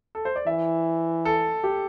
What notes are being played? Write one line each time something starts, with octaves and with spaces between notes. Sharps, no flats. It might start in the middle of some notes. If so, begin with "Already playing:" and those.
A4
C5
D5
E3 E5
A4
G4